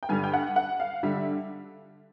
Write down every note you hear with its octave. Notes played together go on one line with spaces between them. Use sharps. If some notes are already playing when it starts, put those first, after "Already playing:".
G5
G2 D3 G3 G#5
G5
F#5
F#5
F5
D3 G3 E5